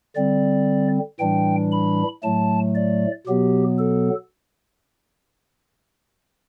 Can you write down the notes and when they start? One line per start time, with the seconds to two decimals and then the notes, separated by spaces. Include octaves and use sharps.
0.15 D3 G3 C4 D5
1.19 A2 E3 G3 D4 G5
1.72 B5
2.23 A2 F#3 A3 A5
2.75 D5
3.27 B2 F#3 B3 G4
3.79 A4